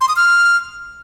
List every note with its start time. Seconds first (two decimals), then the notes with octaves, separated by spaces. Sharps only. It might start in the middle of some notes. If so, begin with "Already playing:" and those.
0.01 C6
0.09 D#6
0.16 F6